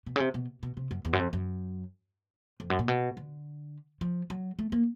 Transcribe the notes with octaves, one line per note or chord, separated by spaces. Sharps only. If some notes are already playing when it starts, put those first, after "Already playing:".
B2
C#3
C3
B2
B2
C3
F#2
E2
F#2
F2
F#2
F2
F#2
A#2
B2
D3
F3
F#3
A3
A#3